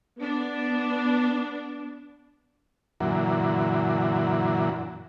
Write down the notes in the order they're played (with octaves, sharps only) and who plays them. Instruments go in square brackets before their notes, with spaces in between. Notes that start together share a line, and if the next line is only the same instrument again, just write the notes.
[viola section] B3 D4
[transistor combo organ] F#2 A#2 D3 E3 F#3